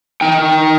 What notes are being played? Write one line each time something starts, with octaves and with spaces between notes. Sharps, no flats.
D#4 G5